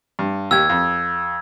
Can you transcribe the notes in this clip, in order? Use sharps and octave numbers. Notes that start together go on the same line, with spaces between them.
G2
D#2 G4 E6 G#6
F2